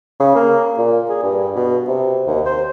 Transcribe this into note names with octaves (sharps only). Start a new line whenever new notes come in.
C#3
A#3
A#2
G#4
G2
B2
C3
D#2
C5